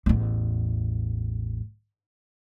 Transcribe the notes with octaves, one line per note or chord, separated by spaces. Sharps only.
A1 E2